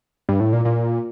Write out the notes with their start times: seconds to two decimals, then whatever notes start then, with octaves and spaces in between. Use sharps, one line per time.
0.29 G2
0.40 A2
0.53 A#2
0.65 A#2